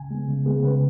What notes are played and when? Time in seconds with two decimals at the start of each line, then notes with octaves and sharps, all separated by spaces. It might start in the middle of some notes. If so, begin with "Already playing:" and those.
Already playing: C#3 G#5
0.11 G#3 B3
0.28 C#3
0.46 B3 G#4
0.49 G#3
0.64 C#3 B4